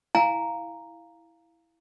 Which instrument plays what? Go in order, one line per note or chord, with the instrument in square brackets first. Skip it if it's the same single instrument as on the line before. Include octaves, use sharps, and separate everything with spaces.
[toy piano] E4 F5 G#5 A#5